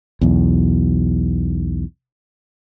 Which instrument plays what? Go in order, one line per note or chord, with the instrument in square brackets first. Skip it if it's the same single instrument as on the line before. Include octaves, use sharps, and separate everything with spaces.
[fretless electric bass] B1 E2